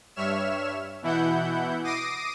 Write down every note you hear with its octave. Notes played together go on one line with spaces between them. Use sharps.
G2 C#5 E5 F6 E7
B2 E3 E4 F#5 G6
D6 D#6 A#6 C7 D7 D#7